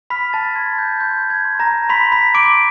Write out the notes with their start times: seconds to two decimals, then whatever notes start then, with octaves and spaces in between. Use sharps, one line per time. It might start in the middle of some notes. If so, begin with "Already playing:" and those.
0.10 B5 F6 B6
0.33 A5 A6
0.56 C6 G#6
0.78 G6
1.00 C6 G6
1.30 G#6
1.45 C6
1.60 A#5 A#6
1.90 B5 C6 B6
2.12 B5 B6
2.35 C6 D6 D7